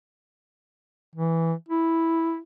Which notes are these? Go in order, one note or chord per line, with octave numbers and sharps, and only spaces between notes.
E3
E4